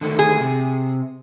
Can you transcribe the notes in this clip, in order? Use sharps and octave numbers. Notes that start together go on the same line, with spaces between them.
D3 D#3 A3
G#4
C3